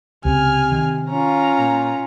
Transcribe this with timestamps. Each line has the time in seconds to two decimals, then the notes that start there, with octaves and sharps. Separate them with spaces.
0.25 C#2 C3 G#5 F6
0.72 D#3
1.10 C#4 F4 A#5
1.59 A#2